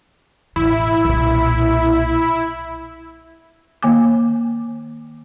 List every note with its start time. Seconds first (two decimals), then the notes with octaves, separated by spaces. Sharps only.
0.56 E1 A1 E4
1.05 B1 A#2
3.83 D#3 A#3 G#5 D6